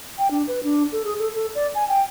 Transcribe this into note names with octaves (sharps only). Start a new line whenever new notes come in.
G5
D4
B4
D4
A4
G#4
A4
A4
D5
G#5
G5